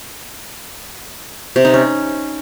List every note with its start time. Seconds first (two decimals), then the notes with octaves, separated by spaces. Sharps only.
1.56 C3
1.65 D#4
1.74 C#4